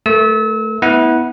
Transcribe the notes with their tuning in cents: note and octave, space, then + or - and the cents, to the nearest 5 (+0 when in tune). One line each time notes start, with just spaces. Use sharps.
A3 +0 A#4 +40 E6 -35
B3 +0 E4 -25 F#5 +0